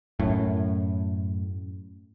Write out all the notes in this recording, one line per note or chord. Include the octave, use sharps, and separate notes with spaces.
F#2 A2